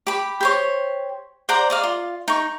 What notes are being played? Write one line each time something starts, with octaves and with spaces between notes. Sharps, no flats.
G4 B5
G4 C5 C#5
C5 D5 F#5 A#5
D5 D#5 F5
F4
D#4 C#6